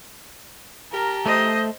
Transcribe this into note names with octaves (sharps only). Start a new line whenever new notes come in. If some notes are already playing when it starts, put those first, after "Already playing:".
G4 A#4 A5 A#5
A3 C5 D#5